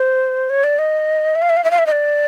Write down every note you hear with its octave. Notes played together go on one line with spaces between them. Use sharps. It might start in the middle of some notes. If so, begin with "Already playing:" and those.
Already playing: C5
C#5
D5
D#5
E5
F5
E5
F5
E5
F5
E5
D#5
D5